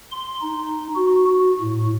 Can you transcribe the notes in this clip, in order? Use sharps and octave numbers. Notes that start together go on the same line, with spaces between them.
C6
D#4
F#4
F#4
A2